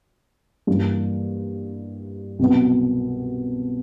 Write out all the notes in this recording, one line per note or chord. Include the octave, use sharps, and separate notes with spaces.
G2 E3 G3 A#3
C2 B2 F#3 B3